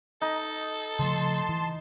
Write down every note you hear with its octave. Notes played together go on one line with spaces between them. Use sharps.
D#4 A4
C#3 F3 A3 A5 C6
E3